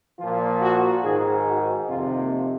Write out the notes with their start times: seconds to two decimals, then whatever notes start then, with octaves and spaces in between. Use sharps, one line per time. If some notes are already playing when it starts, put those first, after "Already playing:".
0.18 A#2 F3 F4
0.61 F#4
1.04 G#2 D#3 G#4
1.46 F#4
1.89 F2 C3 D#3 F4
2.18 A#3